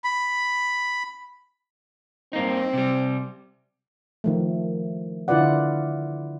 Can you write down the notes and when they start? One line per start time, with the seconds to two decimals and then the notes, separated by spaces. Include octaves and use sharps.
0.04 B5
2.33 G2 A#3 C4 D#4
2.73 C3 G3
4.24 D#3 F3 A3
5.28 D3 E4 F4 B4 D5 F#5